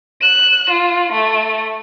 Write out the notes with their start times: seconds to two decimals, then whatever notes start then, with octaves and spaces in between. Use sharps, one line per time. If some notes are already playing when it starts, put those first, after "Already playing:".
0.21 F#6 E7
0.70 F4
1.12 A3